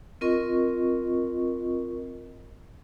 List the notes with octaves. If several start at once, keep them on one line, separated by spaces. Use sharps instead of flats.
C4 F4 A#4 D#5 C#6